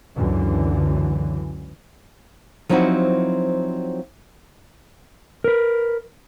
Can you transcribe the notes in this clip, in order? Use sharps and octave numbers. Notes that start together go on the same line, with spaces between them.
C#2 F#2 D3 E3
F3 F#3 C4 D#4 E4 F#4
A#4 B4